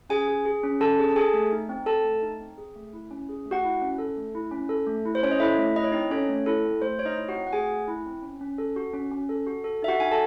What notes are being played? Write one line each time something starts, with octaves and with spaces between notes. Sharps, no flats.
C#4 G#4 G#5
G#4
G#4
C#4
C#4 A4 A5
G#4
A5
G#4 A4 G#5
A3
D#4
C4
A4 A5
A3
D#4
C4
G#4
A3
E4
C#4
G#4
A3
F#4 F#5
E4
C#4
A4
A3
E4
C#4
A4
A3
E4
C5
C#4 C#5
D#5
E4 A4 E5
A3
E4 D#5
C#5
C4 D#4 D#5
C#4 A4 C#5
A3
E4 A4
C4
A3 C5
A3 C#5
D#4 D#5
E4
F#4 F#5
C4
F#5
A3 G#4 G#5
A3
E4
C4
C#4
C#4
A4
F#4
C#4
C#4
A4
F#4
A4
D#4 E5
F#4 F#5
D#4 G#5
A4 A5